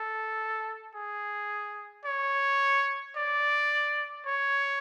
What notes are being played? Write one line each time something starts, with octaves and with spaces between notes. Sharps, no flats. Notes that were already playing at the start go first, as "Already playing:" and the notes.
Already playing: A4
G#4
C#5
D5
C#5